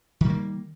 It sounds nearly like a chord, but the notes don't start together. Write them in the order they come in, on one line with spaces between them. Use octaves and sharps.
D#3 G3 A#3